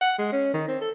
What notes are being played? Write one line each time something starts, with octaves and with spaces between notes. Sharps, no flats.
F#5
G#3
C#4
D#3
C4
A4